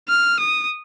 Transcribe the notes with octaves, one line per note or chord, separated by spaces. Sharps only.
F6
D#6